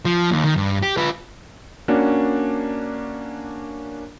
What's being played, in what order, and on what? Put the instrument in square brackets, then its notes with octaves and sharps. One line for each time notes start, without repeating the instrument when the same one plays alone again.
[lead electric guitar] F3
D#2
D#3
G2
G4
F4 B4
[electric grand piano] A#3 C#4 D4 F#4